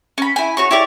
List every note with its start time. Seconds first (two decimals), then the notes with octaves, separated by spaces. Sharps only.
0.18 C#4 B5
0.36 E4 G#5
0.57 F#4 C#5 C#6
0.71 E4 G4 C#5 D5